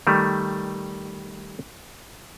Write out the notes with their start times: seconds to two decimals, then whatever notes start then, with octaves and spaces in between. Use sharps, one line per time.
0.07 D#3 G3 A3